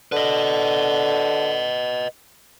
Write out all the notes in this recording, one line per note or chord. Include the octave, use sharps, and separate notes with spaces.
D3 B4 D#5